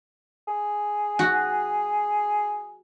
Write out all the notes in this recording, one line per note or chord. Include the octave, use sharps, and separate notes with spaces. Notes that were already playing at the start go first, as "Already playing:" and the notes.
G#4
F#4